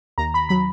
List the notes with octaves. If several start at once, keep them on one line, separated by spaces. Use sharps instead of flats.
D#2 A#5
B5
F#3 B5